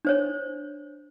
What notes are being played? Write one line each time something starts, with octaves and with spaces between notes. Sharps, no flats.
D4 C5 C#5